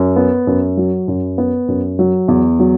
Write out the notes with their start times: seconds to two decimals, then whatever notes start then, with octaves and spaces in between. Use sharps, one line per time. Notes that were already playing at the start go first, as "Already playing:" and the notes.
Already playing: F#2
0.16 B3
0.47 F#2
0.77 F#3
1.08 F#2
1.38 B3
1.68 F#2
1.99 F#3
2.28 E2
2.59 F#3